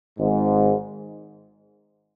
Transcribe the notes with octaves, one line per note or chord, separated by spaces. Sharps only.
G#1 G#2